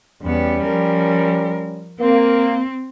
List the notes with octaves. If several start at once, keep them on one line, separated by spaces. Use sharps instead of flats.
E2 G3 B3 C#4
F3 A#4
A#3 C4